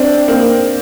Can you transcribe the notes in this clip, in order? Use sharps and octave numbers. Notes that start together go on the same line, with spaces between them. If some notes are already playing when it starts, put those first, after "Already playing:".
Already playing: C4 D4
A#3 C4